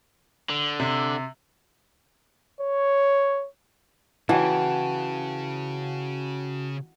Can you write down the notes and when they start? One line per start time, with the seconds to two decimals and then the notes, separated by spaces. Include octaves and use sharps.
0.50 D3
0.80 C3
2.61 C#5
4.29 C#3 E3 F#4 F#5 G5 A5